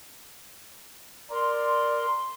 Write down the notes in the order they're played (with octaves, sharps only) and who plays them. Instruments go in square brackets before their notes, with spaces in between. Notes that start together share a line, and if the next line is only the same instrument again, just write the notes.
[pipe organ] A#4 [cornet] D5 [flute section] C6